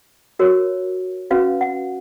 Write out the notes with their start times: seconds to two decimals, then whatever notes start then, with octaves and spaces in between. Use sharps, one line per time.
0.39 F#4 A#4 C#5
1.31 C#4 F#4 B4 F5
1.61 F#5